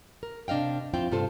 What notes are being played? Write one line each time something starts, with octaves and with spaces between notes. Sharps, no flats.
A#4
C3 D4 D#5 F5 G5
F2 C4 E4 F4 G5
G2 C3 F4 A4 C5